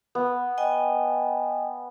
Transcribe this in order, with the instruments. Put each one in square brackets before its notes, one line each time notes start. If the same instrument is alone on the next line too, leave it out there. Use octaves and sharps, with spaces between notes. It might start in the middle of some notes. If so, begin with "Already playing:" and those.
[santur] B3
[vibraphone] D#5 G5 G#5